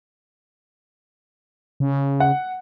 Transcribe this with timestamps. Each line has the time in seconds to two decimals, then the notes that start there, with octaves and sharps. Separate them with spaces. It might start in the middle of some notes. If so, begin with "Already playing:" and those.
1.80 C#3
2.20 F#5